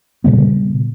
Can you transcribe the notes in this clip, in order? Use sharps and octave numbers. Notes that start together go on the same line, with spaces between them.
A#2 C#3 G3 B3